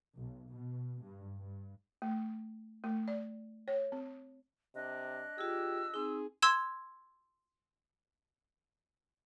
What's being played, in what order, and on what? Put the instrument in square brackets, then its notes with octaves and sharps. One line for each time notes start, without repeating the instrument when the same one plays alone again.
[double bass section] B1
B2
G2
G2
[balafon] A3
A3
D5
C#5
C4
[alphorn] C3 [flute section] D4 D#5 F#6
[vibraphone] F4 G#4 [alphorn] G4 [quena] E6
[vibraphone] C4 D#4 [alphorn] G#4
[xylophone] C6 E6 G#6 E7